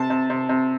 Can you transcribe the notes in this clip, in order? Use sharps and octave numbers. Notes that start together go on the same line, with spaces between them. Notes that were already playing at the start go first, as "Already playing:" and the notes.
Already playing: C3 A5
C3
C3
C3